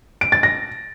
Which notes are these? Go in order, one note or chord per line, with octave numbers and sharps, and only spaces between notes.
D7
A6
A#6